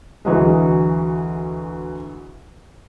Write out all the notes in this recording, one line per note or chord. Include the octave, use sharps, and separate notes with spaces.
D2 E3 F#3 G#3